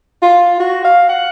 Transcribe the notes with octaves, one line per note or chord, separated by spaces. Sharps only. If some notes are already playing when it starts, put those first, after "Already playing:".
F4
F#4
F5
F#5